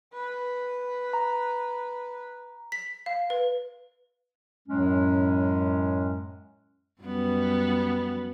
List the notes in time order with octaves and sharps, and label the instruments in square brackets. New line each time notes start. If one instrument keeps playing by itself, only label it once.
[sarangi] B4
[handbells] A#5
[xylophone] B6
F5
B4
[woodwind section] F#2 A2 F#3 G#3 C#4
[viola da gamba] F#2 G3 B3